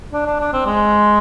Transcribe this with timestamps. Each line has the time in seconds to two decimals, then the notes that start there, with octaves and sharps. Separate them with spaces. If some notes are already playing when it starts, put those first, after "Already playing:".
0.13 D4
0.26 D4
0.40 D4
0.53 C4
0.66 G#3